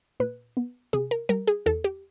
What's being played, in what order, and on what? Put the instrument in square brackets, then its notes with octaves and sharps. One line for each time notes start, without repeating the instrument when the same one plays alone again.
[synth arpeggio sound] A#2 B4
B3
C3 G#4
A#4
G3 A#4
G#4
E2 A4
G4